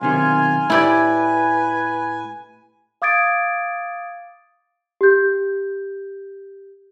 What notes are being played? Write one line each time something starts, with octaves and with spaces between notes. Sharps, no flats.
B1 C3 D#3 F4 G#5
A2 E4 G4 B4 D5
F5 D6 D#6 G#6 A6 D7
G4 G6